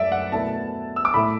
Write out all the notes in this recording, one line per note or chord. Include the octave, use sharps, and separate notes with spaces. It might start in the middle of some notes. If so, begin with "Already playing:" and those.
Already playing: F#2 A3 E4 D5 E5
F#5
B2 A3 E4 A5
E6
D6
A2 A3 E4 B5